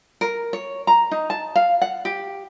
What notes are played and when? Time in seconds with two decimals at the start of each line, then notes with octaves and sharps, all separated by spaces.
0.21 A#4
0.53 C#5
0.87 A#5
1.11 D#4
1.30 A5
1.56 F5
1.82 F#5
2.05 G4